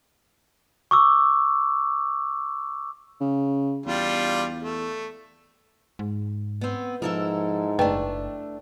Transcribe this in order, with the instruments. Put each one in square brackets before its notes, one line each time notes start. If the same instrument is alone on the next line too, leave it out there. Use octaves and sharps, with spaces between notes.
[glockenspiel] C#6 D6 E6
[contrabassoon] C#3
[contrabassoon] E2 [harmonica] G3 D4 F4
[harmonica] A3
[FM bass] G#2
[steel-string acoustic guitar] B3 C4
[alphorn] G#2 [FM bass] F3 [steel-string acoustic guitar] E4 A4 A#4
[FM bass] F#1 [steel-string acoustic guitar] A3 D4 [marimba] B4 G5